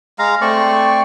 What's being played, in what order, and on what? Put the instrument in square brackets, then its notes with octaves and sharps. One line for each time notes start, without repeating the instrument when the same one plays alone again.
[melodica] G#3 F5 A#5
[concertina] A3 C4 C5 [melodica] D5 C#6